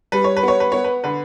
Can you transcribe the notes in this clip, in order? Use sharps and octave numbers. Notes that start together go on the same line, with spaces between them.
G3 B4
C#5
B4
B3 C#5
B4
B3 C#5
B4
D3 B4